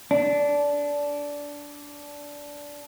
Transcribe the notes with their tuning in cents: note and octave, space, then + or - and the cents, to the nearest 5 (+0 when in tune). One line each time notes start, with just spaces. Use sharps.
D4 -15